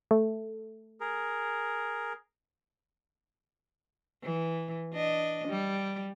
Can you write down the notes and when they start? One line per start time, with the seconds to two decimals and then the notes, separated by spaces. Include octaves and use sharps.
0.11 A3
1.00 G#4 A#4
4.23 E3
4.93 D4 D#5
5.48 G3